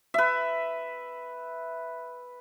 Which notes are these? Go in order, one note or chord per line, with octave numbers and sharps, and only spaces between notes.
B4 E5